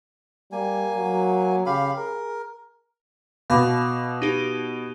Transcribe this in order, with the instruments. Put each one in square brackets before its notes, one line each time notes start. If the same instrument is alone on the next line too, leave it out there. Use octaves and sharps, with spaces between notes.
[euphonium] G3 [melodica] A#3 G#5
[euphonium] F#3
[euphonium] C#3 [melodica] G4 F5 B5
[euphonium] G#4 [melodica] A#4
[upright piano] B2 [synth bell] F5 B5 D6
[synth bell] D#4 G4